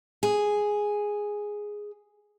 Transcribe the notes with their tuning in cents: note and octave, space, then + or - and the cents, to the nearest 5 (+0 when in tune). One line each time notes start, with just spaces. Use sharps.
G#4 +0